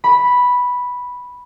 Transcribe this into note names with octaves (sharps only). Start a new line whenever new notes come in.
B5